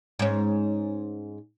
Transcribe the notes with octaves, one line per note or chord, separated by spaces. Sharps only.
G#2 C#4